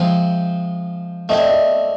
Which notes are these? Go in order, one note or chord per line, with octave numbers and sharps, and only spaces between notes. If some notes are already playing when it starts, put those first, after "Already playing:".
Already playing: F3 G#3 C4 E5
A3 C4 E4 D#5
D5
D#5